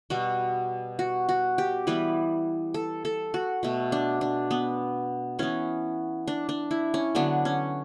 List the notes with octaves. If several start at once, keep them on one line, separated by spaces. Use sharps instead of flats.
B2 G3 B3 F#4
F#4
F#4
G4
E3 G3 B3 B4
A4
A4
F#4
B2 A3
D4
D4
B3
E3 B3 C#4
D4
D4
E4
C#4
D3 F#3 B3 D4
C#4